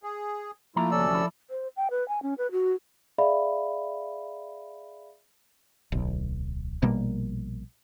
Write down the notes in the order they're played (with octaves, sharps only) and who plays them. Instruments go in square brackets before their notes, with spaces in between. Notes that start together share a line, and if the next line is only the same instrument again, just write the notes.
[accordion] G#4
[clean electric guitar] F3 A#3 A#5 [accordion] A3 E4 F4
[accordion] D2 C3 C#4 [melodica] A4 D5 E6
[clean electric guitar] F3 E4
[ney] C5
G5
B4
G#5
C#4
B4
F#4
[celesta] G#4 D5 E5 F5 B5
[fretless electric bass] D1 B1
A#1 B2 G3 A#3